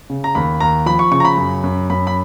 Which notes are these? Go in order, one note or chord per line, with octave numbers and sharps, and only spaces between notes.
C#3
A#5
D#2 B5
D#2 A#5
F3 B5
C#6
C#3 C#6
A#5
B5
F#2
F#2
F#2 B5
B5